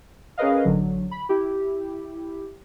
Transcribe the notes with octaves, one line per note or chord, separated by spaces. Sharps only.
C#4 G#4 A#4 B4 D#5 F5
A1 D3 F#3
B5
E4 G4